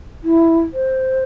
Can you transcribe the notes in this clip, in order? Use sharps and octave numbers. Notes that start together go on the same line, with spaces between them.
E4
C5